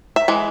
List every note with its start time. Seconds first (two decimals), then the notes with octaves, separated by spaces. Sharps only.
0.16 E5
0.28 E3 G#3